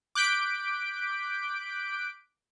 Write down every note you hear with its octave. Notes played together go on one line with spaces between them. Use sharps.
D6 F#6 G6 B6 D7